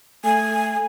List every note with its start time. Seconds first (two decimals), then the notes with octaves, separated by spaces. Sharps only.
0.24 A3 G#5